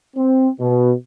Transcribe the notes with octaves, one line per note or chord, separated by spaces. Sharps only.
C4
B2